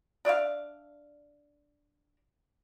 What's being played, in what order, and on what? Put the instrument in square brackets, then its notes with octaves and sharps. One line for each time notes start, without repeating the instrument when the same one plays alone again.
[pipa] D4 D5 E5 F5